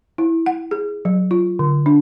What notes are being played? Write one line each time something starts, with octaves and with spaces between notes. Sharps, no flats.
E4
F#5
G#4
F#3
F4
D3
D4